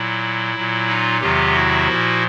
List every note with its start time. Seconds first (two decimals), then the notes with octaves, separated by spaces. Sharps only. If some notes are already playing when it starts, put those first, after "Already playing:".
Already playing: A#2 F#3 E4
0.55 A#2 F#3
0.88 D#4 F4
1.21 E2 C3 D#3 F#3 F4 G4
1.54 E4 F#4
1.88 A#2 F3